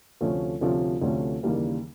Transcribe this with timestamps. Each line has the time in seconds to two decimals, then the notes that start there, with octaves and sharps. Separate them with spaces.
0.21 D2 C3 F3 A3 C#4
0.61 D2 C3 F3 A3 C#4
1.01 D2 C3 F3 A3 C#4
1.43 D#2 C#3 E3 G3 A#3